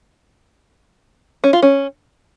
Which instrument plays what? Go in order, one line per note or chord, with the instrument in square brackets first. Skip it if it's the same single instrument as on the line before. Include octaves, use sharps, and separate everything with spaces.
[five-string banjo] C#4
F4
C#4